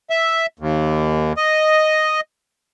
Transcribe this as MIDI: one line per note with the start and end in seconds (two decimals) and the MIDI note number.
0.10 0.46 76
0.59 1.33 39
1.37 2.21 75